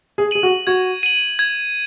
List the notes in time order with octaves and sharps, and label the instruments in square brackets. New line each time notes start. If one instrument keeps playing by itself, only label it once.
[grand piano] G#4
[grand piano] G#4 [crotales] D#7 F#7
[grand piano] F#4
[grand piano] F#4 [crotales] G#6
[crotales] D#7 F#7
G#6